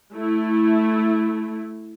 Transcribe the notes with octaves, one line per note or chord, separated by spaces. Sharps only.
A3 E4